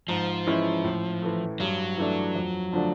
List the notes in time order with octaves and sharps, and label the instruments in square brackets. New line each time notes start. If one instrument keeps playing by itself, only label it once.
[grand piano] G#2 [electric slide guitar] F3
[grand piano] E3 G#3 C#4 E4
A2
E3 A3
[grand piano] G2 [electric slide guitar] F#3
[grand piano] E3 A3 D4
F2
D3 F3 A3 D4